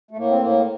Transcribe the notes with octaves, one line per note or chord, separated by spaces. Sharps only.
A3
A2 A#3
C4
A2 A#3